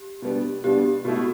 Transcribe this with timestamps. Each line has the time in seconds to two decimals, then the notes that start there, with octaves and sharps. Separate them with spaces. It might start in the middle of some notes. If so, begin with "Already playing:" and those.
Already playing: G4
0.22 B2 G3 B3 D4
0.64 B2 G3 B3 D4 G4
1.05 B2 A3 E4 F#4
1.16 F#4